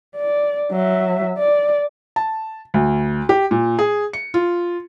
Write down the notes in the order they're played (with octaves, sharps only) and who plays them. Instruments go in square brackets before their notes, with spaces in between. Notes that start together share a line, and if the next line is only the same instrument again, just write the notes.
[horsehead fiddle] D5
F#3 E5
D5
[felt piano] A5
D2
G4
A#2
G#4
C#7
F4